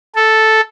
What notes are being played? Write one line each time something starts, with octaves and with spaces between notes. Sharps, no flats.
A4